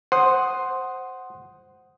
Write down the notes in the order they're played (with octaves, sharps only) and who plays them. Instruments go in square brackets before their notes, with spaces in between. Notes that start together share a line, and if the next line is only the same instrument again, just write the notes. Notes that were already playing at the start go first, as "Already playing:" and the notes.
[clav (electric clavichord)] C5 [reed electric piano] F#5 C6 D#6